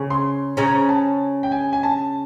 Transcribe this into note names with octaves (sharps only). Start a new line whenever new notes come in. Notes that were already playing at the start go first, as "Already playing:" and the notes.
Already playing: C#3 C#4
C6
C#3 C#4 A#5
A5
G5
G#5
G#5
A5